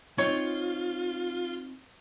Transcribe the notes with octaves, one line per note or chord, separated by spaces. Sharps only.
C4 D#4 F4 C#5